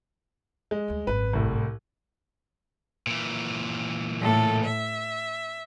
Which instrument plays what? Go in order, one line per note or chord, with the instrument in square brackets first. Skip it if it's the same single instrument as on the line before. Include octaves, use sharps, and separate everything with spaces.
[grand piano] G#3
[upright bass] D2 G3
[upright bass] G#1 F#2 [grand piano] B4
[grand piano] C2 A2
[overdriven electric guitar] A#2 E3
[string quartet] A2 A4
E5